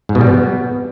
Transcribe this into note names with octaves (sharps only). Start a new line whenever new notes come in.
G#2
B2
G3
B3